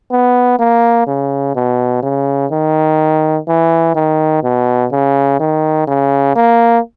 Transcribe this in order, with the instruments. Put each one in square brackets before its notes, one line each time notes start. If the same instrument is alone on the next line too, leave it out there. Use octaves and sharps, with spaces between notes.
[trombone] B3
A#3
C#3
B2
C#3
D#3
E3
D#3
B2
C#3
D#3
C#3
A#3